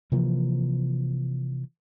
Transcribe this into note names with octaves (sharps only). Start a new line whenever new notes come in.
C3 E3 F3 A#3